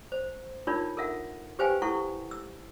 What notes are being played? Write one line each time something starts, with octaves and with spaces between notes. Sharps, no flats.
C5
D4 D#4 F4 A#4 C#5
A4 A#4 E5 F#5
G4 B4 C5 F5 G5 G#5
E4 A4 F#5 C#6
E6